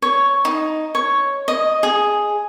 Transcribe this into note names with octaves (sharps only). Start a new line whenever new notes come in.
C#5
D#4
C#5
D#5
G#4